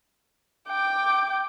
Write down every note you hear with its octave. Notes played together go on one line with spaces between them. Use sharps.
G5 D6